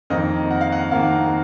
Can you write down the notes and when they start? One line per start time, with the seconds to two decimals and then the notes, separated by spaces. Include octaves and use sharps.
0.10 F2 D#3 A#3 D#5
0.51 F#5
0.61 F5
0.72 F#5
0.91 F2 D#3 A#3 F5